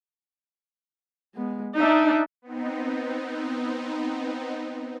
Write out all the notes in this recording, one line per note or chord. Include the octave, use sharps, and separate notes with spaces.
G#3 B3
D4 D#4 E5
B3 C4 D#4